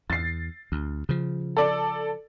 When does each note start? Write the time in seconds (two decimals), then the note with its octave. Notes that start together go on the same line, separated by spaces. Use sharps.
0.10 E2 A6 C7
0.72 D2
1.09 C#3 F3
1.57 A4 D5